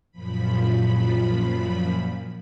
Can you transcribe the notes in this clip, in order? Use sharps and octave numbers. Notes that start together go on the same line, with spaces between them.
F#2 A#2 F3 B5